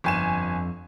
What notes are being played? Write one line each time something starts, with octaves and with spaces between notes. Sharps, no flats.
G1 F2 G#5 E7